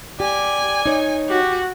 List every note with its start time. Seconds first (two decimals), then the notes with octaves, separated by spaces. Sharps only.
0.20 G4 D5 G#5
0.86 D#4 C#5
1.29 F#4 G4